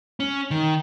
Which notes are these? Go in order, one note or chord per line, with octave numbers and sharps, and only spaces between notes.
C#4
D#3